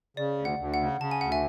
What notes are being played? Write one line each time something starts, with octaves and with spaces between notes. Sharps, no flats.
C#3 D5
D2
F#5
D2
F#5
C#3
C#3 A5
G#5
D2 F#5
E5 G#5